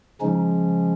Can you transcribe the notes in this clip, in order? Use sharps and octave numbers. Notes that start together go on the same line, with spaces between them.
C#3 F3 G#3 C#4 D#4